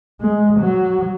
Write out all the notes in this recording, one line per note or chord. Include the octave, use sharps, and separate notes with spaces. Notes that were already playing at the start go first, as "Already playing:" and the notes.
G#3
F#3